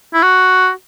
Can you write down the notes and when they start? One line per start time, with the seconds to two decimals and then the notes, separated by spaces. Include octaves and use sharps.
0.14 E4
0.23 F#4